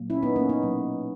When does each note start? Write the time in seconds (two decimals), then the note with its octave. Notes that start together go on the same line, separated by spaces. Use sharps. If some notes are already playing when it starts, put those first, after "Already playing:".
Already playing: A#2 F#3 A#3
0.10 C#4 E4
0.23 B3 D#4
0.36 A#3 C#4
0.49 B3 D#4
0.63 B2 F#3 A#3